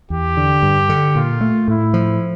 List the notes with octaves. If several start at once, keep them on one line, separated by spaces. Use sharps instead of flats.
E2 G4
D3
G2
D3
A#2 F4
A3
A2 E4
F3